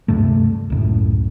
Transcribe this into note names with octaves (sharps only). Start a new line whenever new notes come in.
D2 G2 C3 A3
C#2 F#2 A2